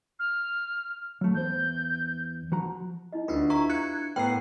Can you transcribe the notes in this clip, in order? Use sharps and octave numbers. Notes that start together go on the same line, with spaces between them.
F6
F#3 A3
E2 C5 G6
F3 F#4 A#5
D#4 E4 D#5
D2 D4 F4 F#4 B4
E4 G4 E5 A#5 C#6
F5 F#6 G#6 C#7
A2 B3 A#4 B4 G5 A#5 B5 C7